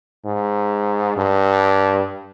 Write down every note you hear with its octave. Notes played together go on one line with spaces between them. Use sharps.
G#2
G2